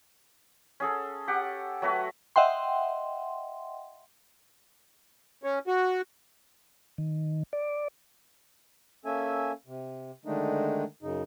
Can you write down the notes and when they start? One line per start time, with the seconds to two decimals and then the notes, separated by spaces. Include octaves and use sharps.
0.80 C#4 G#4 A4
1.28 G4 F#5
1.82 F#3 A3 F#4 B4
2.36 D#5 E5 F#5 G5 C6
5.43 C#4
5.67 F#4
6.98 D#3
7.53 D5
9.05 A#3 C#4 A4 E5 G#5
9.66 C3
10.25 D3 D#3 G#3 A3 D4 D#4
11.02 F#2 C#3 D#4